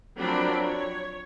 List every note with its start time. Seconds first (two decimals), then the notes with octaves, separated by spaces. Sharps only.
0.17 F3 F#3 C4 D4 A#4 B5
0.66 C#5